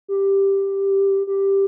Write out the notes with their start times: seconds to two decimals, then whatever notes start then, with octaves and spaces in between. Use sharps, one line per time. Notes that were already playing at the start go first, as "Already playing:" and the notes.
0.08 G4
1.27 G4